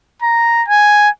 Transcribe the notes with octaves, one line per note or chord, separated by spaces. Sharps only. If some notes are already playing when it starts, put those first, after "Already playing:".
A#5
G#5